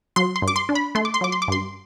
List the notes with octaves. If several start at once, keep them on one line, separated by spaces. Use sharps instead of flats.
F#3 C6
C6
G2
D6
C6
D4
B5
A3 C6
D6
C6
F#3 D6
C6
D6
G2 C6